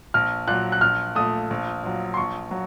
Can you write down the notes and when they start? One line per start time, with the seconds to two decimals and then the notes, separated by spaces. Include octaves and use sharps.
0.14 A#1 F6
0.48 A#2 F#3 F#6
0.72 F#6
0.81 A#1 F6
1.15 A#2 A3 D#6
1.50 A#1
1.83 A#2 F#3
2.14 C6
2.17 A#1 C#6
2.51 F#3